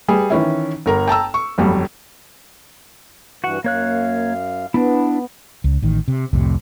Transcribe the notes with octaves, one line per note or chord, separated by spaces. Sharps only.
G3 G#4 B4
D#3 E3 C#4 E4
G1 A#4 A#5
G5 A5 A#5 E6
C#6
G1 F2 F#3 G3
G2 E3 F#4 F#5
F#2 A#3 C#5 F5 F#6
B3 D4 E4
C#2
A1 D#3
C3
C2 F2 A2 C3